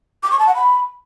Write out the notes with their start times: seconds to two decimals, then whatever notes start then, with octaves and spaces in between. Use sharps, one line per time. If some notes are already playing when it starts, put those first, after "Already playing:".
0.23 D6
0.31 C#6
0.39 A5
0.47 F#5
0.55 B5